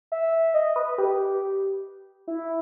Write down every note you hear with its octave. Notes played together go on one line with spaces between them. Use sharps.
E5
D#5
B4
G4
E4